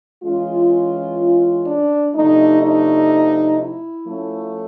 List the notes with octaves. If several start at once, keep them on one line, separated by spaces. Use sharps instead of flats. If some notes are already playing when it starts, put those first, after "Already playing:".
E3 G#3 C#4 F4
D4
C3 F3 A3 D4 D#4
D#4
E4
F3 A3 C#4